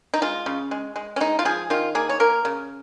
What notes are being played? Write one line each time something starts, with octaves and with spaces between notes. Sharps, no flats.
D#4
G#3 F4
C#3
G#3
G#3
C#4
G#3 D#4
F4
F3 G#4
D#3 F4
A#3 G#4
C#5
A#3 A#4
C#3